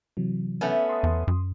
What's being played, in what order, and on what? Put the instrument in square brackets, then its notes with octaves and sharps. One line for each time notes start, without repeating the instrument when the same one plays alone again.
[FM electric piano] C3 E3 F#3
[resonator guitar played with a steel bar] A3 B3 C#4
[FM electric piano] C6 D#6
[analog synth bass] E2
F#2